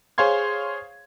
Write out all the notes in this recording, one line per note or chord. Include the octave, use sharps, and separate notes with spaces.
G#4 C5 C#5 F5 C6 G#6